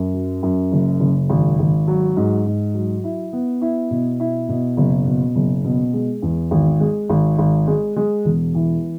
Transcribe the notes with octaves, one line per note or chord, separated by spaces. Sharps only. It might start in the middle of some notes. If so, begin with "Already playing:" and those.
Already playing: F#2
F#3
F#2
F#1
F#1
G#1
G#1
F#3
G#2
G#2
F#3
E4
B3
E4
B2
E4
B2
F#1
B2
F#1
B2
G#3
E2
G#1
G#3
G#1
G#1
G#3
G#3
E1
E3